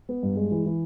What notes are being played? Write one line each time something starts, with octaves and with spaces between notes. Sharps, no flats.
B3
G2
G#3
E3
E3